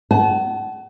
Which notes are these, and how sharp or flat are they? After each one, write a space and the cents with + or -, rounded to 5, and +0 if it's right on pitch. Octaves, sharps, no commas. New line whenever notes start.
F#5 +35 A5 -35